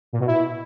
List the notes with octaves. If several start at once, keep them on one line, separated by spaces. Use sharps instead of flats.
A#2
B2
E4